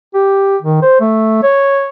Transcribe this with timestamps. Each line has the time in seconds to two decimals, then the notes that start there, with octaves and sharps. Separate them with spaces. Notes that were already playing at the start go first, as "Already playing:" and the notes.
0.14 G4
0.62 D#3
0.82 C5
1.01 A3
1.43 C#5